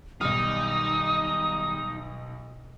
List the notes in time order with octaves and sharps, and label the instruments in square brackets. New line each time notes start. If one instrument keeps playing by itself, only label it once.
[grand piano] B1 F6 [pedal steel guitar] D#3 G3 [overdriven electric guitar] D#4 [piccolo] D#6